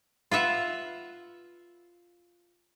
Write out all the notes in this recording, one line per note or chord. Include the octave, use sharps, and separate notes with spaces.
F4 B4 E5 F#5